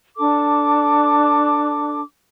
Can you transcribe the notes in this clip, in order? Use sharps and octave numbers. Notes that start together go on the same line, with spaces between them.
D4 A4 D6